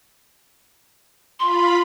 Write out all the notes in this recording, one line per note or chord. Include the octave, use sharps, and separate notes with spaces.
F4 B5 C6